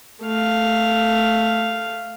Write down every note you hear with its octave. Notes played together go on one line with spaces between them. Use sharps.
A3 F5